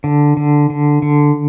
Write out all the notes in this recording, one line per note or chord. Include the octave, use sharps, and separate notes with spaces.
D3
D3
D3
D3